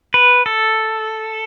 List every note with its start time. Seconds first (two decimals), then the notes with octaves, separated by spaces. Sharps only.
0.14 B4
0.46 A4